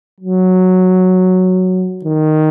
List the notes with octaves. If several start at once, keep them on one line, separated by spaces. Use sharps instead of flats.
F#3
D#3